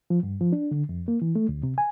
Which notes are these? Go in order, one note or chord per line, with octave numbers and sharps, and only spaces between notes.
F3
G2
F3
D4
D3
F2
A#3
E3
A3
D2
C3
G#5